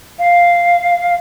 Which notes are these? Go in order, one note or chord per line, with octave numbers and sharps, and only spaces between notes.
F5